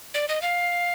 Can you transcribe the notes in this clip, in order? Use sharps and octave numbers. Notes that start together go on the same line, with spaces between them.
D5
D#5
F5